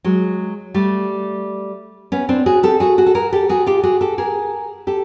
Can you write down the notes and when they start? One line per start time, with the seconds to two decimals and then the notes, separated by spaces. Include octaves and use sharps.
0.04 F#3 G#3
0.74 G3 A3
2.12 B3 C#4
2.29 C4 D4
2.46 F#4 G#4
2.63 G4 A4
2.80 F#4 G#4
2.98 F#4 G#4
3.06 A4
3.15 G#4 A#4
3.33 G4 A4
3.49 F#4 G#4
3.66 F4 G4
3.83 F#4 G#4
4.01 G4 A4
4.18 G#4 A#4
4.87 G4 A4